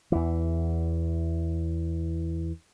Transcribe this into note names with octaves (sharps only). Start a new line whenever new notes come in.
E2 E3